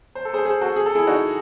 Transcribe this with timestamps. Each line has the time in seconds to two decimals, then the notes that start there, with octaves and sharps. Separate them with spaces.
0.15 C5
0.25 A4
0.33 G#4 C5
0.45 G#4 C5
0.61 F#4 A4
0.76 G#4
0.86 A4
0.95 E4 G#4
1.07 D#4 F#4